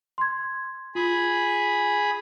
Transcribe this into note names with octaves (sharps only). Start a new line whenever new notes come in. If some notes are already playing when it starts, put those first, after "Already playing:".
C6 G#6
F4 G#4 B5